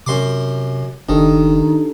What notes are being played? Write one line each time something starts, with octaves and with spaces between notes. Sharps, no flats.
F#2 C3 C6 D6
F#1 D#3 D4 D#4 G4 A4